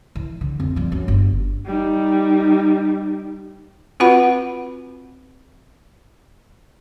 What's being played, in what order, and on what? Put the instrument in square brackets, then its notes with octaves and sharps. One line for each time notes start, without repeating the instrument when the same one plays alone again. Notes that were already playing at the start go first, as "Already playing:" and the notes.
[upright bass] E3
D3
F2
F3 G3
F#2
G1
[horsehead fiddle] G3 D#4
[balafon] C4 F4 F#4 B4 F#5 B5